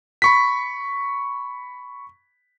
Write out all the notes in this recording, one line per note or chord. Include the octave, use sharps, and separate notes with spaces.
B5 C#6 B6